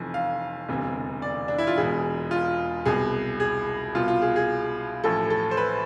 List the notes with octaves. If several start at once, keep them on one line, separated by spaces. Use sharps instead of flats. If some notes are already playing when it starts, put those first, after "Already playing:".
Already playing: F1 F2 E3
F5
E1 D2 C3 E3
D5
D4
E4
F4
E1 E2 B2 G#4
F4
C2 B2 G#4
G#4
C2 B2 F4
F4
G#4
G#4
A1 A2 F3 A4
A4
C5
B4